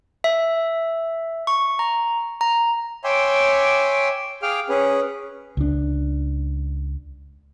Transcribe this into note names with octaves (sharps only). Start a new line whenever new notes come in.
E5
C#6
A#5
A#5
C#5 E5 G5 G#5 C6 D6
G#4 F5 G5 D6 F6
C#4 G#4 B4
C#2 D4